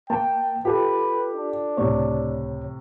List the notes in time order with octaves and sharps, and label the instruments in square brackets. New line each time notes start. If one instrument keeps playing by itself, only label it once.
[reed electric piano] A#3 A#4 [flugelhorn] G5 [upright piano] A5
[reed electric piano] F4 A4 [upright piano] G4 [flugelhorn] B4
[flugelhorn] D4
[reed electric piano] C#2 C#5 [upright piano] A2 C3